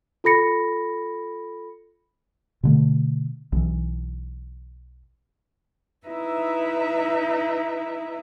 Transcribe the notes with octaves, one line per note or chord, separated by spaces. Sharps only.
F4 A4 B5 A#6 C#7
B2 D3 A3
B1 E3
D#4 E4 B4 E5